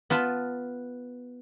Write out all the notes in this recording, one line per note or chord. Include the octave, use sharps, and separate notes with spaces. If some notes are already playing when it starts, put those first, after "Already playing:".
B3 F4 B4 A5